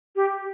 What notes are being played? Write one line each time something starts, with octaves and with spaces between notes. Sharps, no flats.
G4